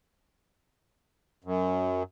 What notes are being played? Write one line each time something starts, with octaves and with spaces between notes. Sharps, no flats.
F#2